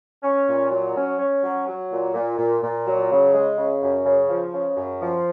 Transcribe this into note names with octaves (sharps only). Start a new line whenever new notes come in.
C#4
A#2
F#3
C#4
C#4
F#3
F#3
A#2
A#2
A#2
A#2
F#3
C#3
G#3
C#3
F#2
C#3
F3
C#3
F#2
F3